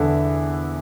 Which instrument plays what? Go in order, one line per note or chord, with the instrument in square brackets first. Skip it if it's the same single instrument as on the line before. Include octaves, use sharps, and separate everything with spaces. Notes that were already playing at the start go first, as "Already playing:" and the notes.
Already playing: [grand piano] E2 D3 E4